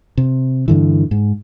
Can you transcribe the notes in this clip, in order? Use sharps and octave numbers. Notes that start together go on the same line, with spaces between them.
C3
G2 D3 E3
G#2